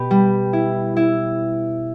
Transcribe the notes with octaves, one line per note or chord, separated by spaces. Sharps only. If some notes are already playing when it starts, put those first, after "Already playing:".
Already playing: B2 G4 B4
G3
E4
E4